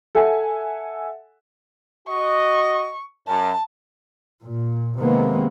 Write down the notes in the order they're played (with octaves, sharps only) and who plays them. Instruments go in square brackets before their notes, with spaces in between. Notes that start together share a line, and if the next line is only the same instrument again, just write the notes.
[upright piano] A4 E5 F#5 G#5
[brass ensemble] F#4 D#5 [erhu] C#6
[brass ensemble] F#2 [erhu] A5
[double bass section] A#2
C3 D#3 G#3 A#3 B3